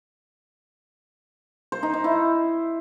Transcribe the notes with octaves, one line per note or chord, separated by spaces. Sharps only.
C5
D#4
D#4
E4